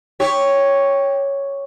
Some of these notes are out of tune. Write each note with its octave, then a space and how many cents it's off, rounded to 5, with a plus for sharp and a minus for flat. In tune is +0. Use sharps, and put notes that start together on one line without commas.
G4 +10 C#5 +0